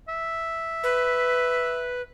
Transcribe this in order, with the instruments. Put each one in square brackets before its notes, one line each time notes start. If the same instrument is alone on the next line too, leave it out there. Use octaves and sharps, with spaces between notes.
[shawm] E5
[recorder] B4